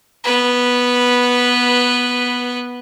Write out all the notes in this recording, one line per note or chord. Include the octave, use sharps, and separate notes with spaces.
B3 B4